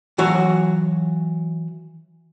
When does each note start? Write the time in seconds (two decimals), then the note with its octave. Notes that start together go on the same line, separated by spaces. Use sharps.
0.18 E3 F#3 F#4 C#5